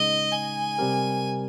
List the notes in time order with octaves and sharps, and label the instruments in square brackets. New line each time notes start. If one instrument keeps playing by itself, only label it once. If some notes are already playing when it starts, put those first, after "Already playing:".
Already playing: [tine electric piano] C#3 G#3 D#4 [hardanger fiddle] D#5
[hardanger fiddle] G#5
[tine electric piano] C3 G3 C4 G4 A#4